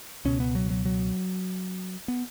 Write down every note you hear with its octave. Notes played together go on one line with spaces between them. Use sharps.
C#2 B2 C#4
B3
F#3
F#3
F#3
B3